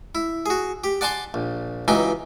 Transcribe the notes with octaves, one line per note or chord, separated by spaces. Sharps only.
E4
F#4 G#4
G4
D5 F#5 G#5 A5 C6 D6
A#1
C#2 E3 F#3 D#4 G5 G#5